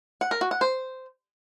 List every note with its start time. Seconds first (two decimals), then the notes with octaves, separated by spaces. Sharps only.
0.21 F#5
0.31 A#4
0.41 F#4
0.51 F#5
0.61 C5